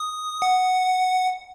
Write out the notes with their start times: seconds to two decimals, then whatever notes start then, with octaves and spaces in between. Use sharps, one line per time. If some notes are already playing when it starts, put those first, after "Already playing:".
Already playing: D#6
0.42 F#5